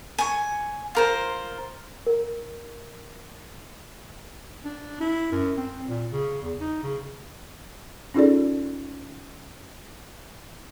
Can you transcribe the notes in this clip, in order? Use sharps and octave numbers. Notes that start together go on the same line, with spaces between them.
G#5 C#6
F4 A#4 C5
A#4
D4
E4
F#2
C4
A#2
C#3
E2
D#4
C#3
C#4 D#4 F4 G#4 A4 D5